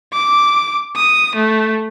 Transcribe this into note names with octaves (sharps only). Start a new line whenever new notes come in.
D6
D#6
A3